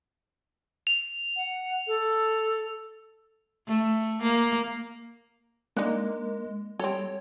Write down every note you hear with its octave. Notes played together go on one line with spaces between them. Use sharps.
F7
F#5
A4
A3
A#3
G#3 A#3 D4 D#4 A#4
G3 C4 A4 C#5